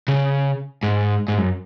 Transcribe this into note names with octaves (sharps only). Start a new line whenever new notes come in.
C#3
G#2
G#2
F#2